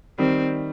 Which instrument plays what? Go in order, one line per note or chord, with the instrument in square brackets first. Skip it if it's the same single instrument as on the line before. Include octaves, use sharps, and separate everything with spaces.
[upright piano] D#3 G3 [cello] C4